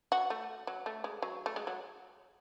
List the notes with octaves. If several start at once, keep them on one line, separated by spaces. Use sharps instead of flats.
F#4
A3
F#3
A3
G#3
F#3
A3
G#3
F#3